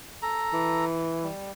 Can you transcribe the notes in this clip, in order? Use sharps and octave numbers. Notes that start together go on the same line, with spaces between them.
A4 A#5
E3
G3